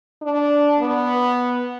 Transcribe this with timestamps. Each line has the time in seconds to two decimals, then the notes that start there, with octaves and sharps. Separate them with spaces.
0.22 D4
0.79 B3